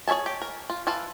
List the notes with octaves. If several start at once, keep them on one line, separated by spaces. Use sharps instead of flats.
G#4 C#5 E5 G#5 A5
G4
A#4
F4
E3 F4 F5 A5